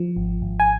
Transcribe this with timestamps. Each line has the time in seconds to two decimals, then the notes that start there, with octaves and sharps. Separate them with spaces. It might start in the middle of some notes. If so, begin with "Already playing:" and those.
Already playing: F3
0.16 G#1
0.42 G#1
0.60 G#5